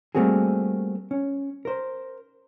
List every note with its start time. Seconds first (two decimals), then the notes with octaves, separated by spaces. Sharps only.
0.15 G3 A3 A#3 C4 F#4 G#4
1.11 C#4
1.65 A#4 C5